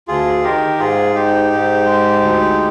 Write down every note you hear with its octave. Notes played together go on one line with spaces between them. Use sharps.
D2 F4 G#4
D#3 G4 A#4
G#2 F4 G#4
G#2 D#4 G4
G#2
G#3
D2